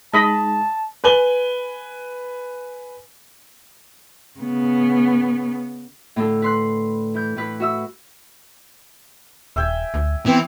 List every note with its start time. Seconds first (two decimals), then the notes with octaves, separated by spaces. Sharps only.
0.14 G#3 D#4 D#5 A5 B5
1.04 B4 G#5 F#7 G7
4.40 C#3 B3
6.16 A2 D3 A4
6.42 B4 C6 F#6
7.14 E3 G6
7.37 A2 B4 F#6
7.60 F#4 E5 E6
9.56 D#1 E5 G5 G#5
9.94 D2
10.26 E3 B3 C4